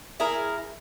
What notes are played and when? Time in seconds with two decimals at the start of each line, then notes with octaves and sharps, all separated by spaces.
0.20 E4 G#4 A#4